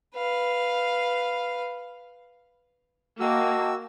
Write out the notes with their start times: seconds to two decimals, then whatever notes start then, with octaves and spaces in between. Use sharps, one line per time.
0.15 B4 F5
3.20 A#3 F#4 D#5 G5 A5 E6